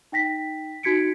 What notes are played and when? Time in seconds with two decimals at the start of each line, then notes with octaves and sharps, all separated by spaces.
0.12 D#4 G5 A#6 B6
0.83 D#4 F#4 G#6 B6 C#7 D7